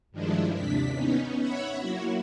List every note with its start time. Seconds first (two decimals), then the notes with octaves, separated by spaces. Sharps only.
0.11 G2 D#3 F3 G#3 D4 E4
0.54 D#2 C3 D4 B6
0.93 B3 C#4 D#4
1.39 C#5 E5 F#5 B5
1.79 F#3 A#3 E4 F#4